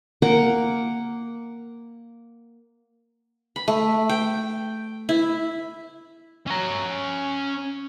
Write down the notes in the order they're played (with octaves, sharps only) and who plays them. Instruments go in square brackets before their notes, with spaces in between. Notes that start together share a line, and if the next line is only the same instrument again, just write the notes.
[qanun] A#3 A#4 F#5
B5
A3
G5
E4
[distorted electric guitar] C#4 A#5